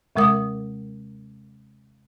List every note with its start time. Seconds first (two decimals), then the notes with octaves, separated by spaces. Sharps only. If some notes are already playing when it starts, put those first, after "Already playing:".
0.16 D#2 C3 G#3 A#4 D6 D#6